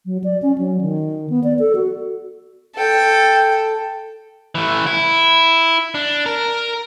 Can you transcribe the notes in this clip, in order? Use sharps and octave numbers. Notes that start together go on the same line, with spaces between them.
F#3
D5
C#4
F#3
D#3
B3
D5
A4
F#4
A4 G5
E3 A3
E4
D4
A#4